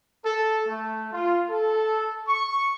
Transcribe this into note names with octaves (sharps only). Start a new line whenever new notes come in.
A4
A3
F4
A4
C#6